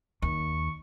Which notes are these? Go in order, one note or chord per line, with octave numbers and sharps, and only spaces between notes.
D#2 C#6